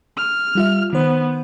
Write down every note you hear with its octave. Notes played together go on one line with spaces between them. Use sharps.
F6
G3 F4 E5
D#3 B3 C5